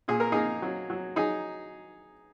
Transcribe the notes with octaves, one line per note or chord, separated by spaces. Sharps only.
A#2 G#4
A#4
A#3 D#4 G#4
F#3
F#3
F#3 D#4 G#4